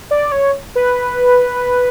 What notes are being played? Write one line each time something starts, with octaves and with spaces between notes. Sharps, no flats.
D5
C#5
B4